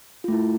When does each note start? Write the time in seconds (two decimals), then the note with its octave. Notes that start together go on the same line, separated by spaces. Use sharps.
0.24 F4
0.28 A3
0.32 E4